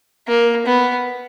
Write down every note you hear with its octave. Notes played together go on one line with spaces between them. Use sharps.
A#3
B3